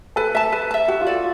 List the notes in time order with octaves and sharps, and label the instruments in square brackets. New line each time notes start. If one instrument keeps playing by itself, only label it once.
[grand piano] A4 [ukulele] B4
[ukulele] E5 A5
B4
E5 A5
[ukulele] F#4 [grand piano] G4
[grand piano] F4
[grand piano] F#4 [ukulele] A4 D5